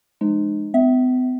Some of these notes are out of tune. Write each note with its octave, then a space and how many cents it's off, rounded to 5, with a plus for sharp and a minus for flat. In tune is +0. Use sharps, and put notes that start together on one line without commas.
F3 -30 G#3 +10 D#4 -40
B3 +45 E5 -10